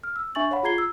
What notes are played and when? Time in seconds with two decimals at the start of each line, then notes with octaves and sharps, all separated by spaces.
0.04 F6
0.16 E6
0.35 D4 E5 G#5 C#6 A6 F#7
0.51 C#5 F5 F#5 B5
0.63 F4 G#4 A#5 G#6 C7 G7
0.78 E6